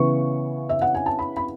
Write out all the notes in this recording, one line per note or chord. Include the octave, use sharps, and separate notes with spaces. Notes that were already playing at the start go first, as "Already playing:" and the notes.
Already playing: C#3 E3 B3 C#6
E5
F#5
G#5
A5
B5
B5